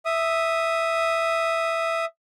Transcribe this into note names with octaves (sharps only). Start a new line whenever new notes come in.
E5 D#6